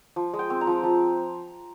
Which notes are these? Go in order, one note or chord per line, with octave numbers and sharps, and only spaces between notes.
F3
G#3
G5
C4
A#5
F3
F3